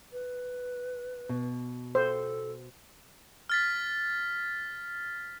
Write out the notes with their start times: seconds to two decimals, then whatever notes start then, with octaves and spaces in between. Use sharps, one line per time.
0.13 B4
1.29 B2
1.95 A4 C5
3.50 F6 A6 B6